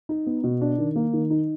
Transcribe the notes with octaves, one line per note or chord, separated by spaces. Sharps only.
D#4
B3
B2
D4
D#3
A#3
D#3
D#4